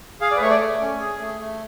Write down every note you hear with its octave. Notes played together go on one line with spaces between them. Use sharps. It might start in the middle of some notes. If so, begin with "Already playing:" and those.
G#4 F5
D5
B4
A3 C#5
D5
A3
C#4
G#4
A3
A3